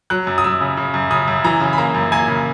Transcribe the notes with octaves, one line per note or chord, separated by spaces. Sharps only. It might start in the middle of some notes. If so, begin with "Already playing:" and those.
F#3 F#6
F#2
D#6
F#2 E6
C#3
C#3
F#2
C#3 D#6
F#2
E3 A#5
C#3
B5
A#3 A#5
F#2
A#3 G#5
C#3